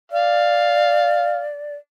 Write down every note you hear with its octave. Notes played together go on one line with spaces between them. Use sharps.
D5 F5